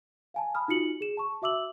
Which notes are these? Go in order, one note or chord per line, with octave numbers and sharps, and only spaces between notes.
F5 G#5 A5
B5 D#6 F6
D#4 F4 F#4 C#7 F#7
G#4 E7
A5 C#6
F#4 E5 D6 E6 F#7